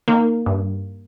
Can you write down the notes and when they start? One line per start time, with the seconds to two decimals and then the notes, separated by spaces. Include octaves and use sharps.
0.08 D#3 A#3
0.46 G2